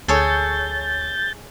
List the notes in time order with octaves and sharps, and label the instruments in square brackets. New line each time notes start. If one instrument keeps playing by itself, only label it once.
[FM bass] D2 [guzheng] G#4 A4 C#5 [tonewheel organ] G6 A6